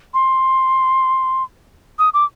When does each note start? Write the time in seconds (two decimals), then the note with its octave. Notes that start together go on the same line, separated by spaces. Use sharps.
0.14 C6
1.99 D#6
2.14 D6